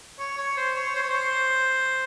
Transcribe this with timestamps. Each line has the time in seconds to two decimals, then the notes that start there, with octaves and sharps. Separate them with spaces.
0.19 C#5
0.38 C#5
0.57 C5
0.76 C#5
0.95 C5
1.02 C#5
1.10 C5